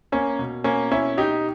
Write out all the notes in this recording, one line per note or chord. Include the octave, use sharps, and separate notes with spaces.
A#3 C#4
B2
A#3 C#4
C#4 E4
D#4 G4